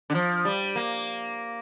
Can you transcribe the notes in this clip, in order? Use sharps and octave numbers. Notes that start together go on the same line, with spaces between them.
D3
F3
G3
A#3